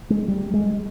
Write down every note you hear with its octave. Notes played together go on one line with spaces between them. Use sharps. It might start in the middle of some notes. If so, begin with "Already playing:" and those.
G#3
G3
G#3